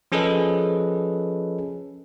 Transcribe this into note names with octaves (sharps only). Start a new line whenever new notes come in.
F3 C#4 G#4 A4 B4 D#5